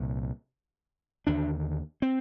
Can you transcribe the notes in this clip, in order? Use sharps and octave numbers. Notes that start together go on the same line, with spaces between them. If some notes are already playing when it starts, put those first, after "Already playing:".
Already playing: C2 A#2
D#2 D3 D4
C4